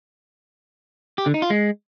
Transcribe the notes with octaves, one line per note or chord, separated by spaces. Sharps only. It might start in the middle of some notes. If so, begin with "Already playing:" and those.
G4
D3
D#4
F4
G#3